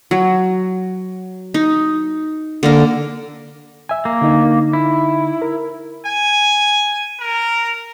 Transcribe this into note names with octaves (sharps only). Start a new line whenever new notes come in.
F#3
D#4
D3 A#3 A#4
E5 G#5
A#3
D3 D#4
E4
A#4
G#5
A#4